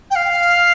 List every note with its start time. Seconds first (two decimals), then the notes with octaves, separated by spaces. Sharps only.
0.11 G5
0.16 F5